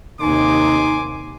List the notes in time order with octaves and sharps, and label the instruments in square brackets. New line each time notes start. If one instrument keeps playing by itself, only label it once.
[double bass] D#2 C3 [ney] D#4 [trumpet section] G#5 C6 D6